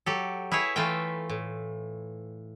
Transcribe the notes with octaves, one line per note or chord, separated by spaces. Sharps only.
F#3 G4 A4
E4 G#4 B4 C#5 E5
E3 A3 F4 E5 G5
A2